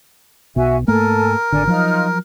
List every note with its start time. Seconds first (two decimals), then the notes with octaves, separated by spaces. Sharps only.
0.56 B1 B2 F#4 E5 G#5
0.88 G#2 A3 A#3 A4 A#4 G#5
1.52 G#1 D3 D5 G#5
1.67 F3 F#3 D#4 F4 F6